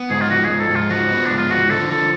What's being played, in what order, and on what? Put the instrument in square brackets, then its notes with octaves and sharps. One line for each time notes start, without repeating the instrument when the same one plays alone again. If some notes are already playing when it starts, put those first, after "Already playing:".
Already playing: [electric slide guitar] B3
[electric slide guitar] G#2 [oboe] G#4
[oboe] F4
[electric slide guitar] F3 [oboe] F#4
[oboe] G#4
[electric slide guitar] G#2
[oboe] A4
[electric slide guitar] G#2 [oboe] F4
[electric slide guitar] F3 [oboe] F#4
[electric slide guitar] B3
[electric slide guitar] G#2 [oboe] D4
[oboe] F4
[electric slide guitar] F3 [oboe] F#4
[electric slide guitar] D3 [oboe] A4
[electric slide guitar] F3 [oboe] A4